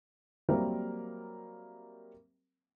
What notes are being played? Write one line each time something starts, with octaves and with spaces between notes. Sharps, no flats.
F#3 G3 A#3 C4 A#4 E5